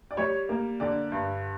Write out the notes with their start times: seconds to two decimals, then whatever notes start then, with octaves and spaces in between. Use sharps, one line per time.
0.11 D5
0.17 G3 C#5
0.49 A#3
0.80 D3 D5
1.12 G2